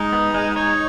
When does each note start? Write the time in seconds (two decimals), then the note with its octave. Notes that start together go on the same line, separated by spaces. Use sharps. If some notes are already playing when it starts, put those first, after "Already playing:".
Already playing: G#3 D#4
0.13 B3
0.34 G#3
0.56 D#4 C#5